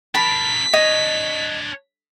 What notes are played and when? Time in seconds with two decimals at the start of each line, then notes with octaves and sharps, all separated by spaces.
0.15 D4 A#4 A5 B5 B6
0.73 D4 C#5 D#5 D#6